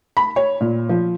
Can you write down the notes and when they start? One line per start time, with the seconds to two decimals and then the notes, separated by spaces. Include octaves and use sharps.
0.17 B5
0.36 C#5
0.61 A#2
0.89 F3